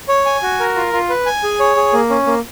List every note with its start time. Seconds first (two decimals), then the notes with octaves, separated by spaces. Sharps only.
0.09 C#5
0.26 G#5
0.43 F#4
0.60 A#4
0.76 F4
0.93 F4
1.09 B4
1.26 G#5
1.43 G#4
1.60 C#5
1.76 G#4
1.93 A#3
2.10 C#4
2.27 A#3